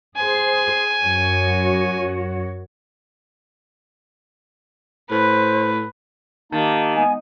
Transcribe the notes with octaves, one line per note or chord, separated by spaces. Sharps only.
G#4 C5 G#5
F#2 F#4 C#5
A2 B4 C5
D#3 A#3 D#4 G4 D#5 A5
G#3 B3 G#5